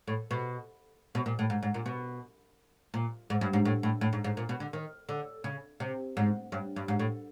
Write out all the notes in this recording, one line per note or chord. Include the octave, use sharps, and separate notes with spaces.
A2
B2
B2
A#2
A2
G#2
G#2
A#2
B2
A#2
G#2
G2
G#2
A2
A2
A2
G#2
G#2
A#2
B2
D3
D#3
D3
C#3
C3
G#2
G2
G2
G#2
A2